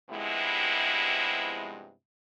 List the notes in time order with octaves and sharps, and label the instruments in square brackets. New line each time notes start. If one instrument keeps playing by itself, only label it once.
[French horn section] G2 C3 F3 G#3 B3 E4